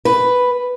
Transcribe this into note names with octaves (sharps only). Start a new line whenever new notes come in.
B4